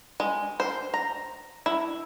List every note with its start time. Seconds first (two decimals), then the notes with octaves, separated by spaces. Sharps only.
0.20 G#3
0.60 C5
0.94 A#5
1.66 E4